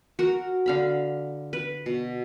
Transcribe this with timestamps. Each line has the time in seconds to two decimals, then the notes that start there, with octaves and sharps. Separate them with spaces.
0.19 F#4 A#4
0.66 D3 F5 B5
1.53 B4
1.86 B2